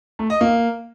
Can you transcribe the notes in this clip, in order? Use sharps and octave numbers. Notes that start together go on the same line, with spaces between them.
A3
D#5
A#3